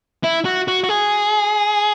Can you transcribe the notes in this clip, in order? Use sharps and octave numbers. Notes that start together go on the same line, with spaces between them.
E4
F#4
F#4
F#4
G#4